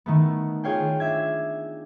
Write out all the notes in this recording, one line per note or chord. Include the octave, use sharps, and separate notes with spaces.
D#3 A3 B3
F4 G#4 C#5 F5 G5
D4 E5 G#6